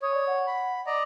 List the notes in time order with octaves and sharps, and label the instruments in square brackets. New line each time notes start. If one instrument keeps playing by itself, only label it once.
[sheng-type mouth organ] C#5 [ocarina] D#6
[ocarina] D5
F#5
[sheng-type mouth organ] B5
D5 D#5 A#5